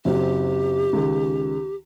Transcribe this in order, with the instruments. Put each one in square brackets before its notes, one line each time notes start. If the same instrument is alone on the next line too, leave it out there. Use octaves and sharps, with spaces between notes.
[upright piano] F#1 F#3 C4 [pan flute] G4
[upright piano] C#2 D#3